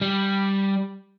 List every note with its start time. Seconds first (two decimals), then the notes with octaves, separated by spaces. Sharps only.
0.01 G3